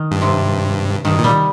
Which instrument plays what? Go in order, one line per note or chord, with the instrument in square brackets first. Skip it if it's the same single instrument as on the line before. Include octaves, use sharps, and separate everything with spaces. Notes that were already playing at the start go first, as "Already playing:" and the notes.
Already playing: [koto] D#3
[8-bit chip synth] G2
[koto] C3
[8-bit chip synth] G2 [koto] D#3
[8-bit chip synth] A#2
[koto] G3